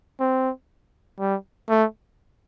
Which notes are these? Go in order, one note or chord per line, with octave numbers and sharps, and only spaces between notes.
C4
G3
A3